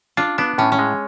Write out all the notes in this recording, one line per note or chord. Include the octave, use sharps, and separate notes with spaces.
D4 F4
B3 D4
A2 C#4
C#4
G#3